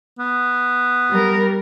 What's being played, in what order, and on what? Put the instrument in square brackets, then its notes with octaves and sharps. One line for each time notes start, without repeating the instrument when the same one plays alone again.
[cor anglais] B3
[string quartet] G3 A#4